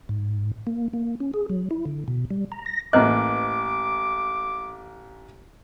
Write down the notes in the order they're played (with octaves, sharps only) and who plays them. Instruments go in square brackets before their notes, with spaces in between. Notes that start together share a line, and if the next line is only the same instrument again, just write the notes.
[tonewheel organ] G#2
A#3
A#3
C#4
G#4
F#3
E4
D3
B2
G3
A#5
A#6
[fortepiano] A1 A#3 F#6 [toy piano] B4 D#5 [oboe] D6